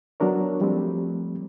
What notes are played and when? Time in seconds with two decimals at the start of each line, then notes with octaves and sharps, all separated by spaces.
0.20 F#3 B3 D4 A#4 C#5
0.60 F3 G3 A3 C4